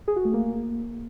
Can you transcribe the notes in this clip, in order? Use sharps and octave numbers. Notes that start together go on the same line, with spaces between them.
G#4
F#4
A3
A#3